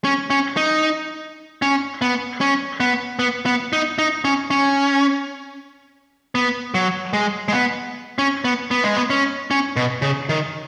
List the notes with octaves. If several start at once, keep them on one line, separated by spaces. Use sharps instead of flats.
C#4
C#4
D#4
C#4
B3
C#4
B3
B3
B3
D#4
D#4
C#4
C#4
B3
F#3
G#3
G#3
B3
C#4
B3
B3
G#3
B3
C#4
C#4
B2
C#3
D#3